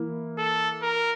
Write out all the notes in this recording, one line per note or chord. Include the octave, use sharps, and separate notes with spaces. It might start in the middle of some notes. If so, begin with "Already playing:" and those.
Already playing: E3 A#3 E4
A4
A#4